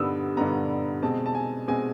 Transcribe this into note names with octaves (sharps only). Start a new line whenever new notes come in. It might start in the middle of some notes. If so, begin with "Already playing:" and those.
Already playing: G2 D3 G3 B3 D#6 E6
G2 D3 G3 B3 A#5
B2 G#3 C4 A5
A5
G#5
B2 G#3 C4 G#5